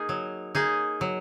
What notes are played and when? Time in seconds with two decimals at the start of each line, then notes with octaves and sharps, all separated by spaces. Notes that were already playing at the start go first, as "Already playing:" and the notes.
Already playing: A#3 D#4 G#4
0.09 F#3
0.55 A#3 D#4 G#4
1.01 F#3